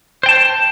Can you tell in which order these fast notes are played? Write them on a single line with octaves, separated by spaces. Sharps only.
C5 G5 A5